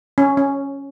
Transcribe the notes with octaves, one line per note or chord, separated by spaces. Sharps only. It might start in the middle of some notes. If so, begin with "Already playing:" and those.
C#4
C#4